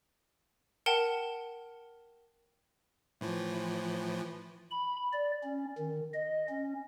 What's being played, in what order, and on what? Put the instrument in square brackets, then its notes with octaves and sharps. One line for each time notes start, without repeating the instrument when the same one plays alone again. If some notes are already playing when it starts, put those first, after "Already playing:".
[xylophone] A#4 F#5 G5 A5
[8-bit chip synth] A2 E3 F3
[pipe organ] B5
D5
C#4
D#3
D#5
C#4